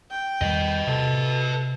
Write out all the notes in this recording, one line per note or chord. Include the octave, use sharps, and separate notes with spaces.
G5
E2 D#3 G3 B4 D#5
C3 A4